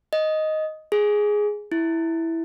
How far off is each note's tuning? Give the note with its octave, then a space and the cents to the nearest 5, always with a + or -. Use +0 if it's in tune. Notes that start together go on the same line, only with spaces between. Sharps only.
D#5 +5
G#4 +5
E4 -5